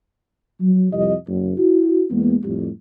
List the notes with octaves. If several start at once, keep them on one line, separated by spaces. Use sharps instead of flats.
F#3
C2 F2 G3 G4 D#5
F#1
E4 F#4
E2 G#3 A#3 B3
F2 A2 G3